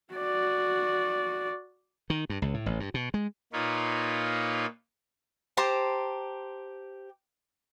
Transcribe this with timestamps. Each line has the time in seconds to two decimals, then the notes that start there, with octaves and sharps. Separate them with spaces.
0.13 F#4 D5
2.10 D#3
2.30 G2
2.42 C#2
2.54 A2
2.66 A1
2.80 G2
2.94 B2
3.14 G#3
3.53 A#2 A#3 D#4 F4 B4 C#5
5.57 G4 C5 A5 A#5